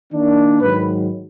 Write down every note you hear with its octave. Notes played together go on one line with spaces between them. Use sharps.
D#3 A#3 D4
G#2 D#3 F#3 B4